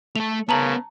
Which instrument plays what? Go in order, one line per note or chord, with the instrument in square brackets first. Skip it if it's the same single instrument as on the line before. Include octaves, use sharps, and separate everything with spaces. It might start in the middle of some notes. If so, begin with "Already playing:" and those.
[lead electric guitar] A3 A4 [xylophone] F7
[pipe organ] C#3 [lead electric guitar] B3 A#4 [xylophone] A5 A#5 F#7